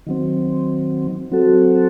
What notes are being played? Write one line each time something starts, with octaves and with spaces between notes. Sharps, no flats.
D#3 F#3 C4
F#3 C4 F#4 A4